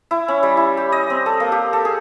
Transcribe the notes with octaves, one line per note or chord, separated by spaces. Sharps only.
E4
C#4
G3
E4
G4
D#5
C4
A4
A#3
G4
A4
G#4